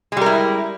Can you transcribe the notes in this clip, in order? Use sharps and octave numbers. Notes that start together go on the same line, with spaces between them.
G3 G#3 E4 A#4